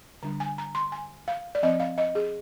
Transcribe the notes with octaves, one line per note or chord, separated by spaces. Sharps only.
D3 G3 D4 A#5
G#5
A#5
C6
G#5
F5
D5
F3 C4 D#5
F5
D#5
G#4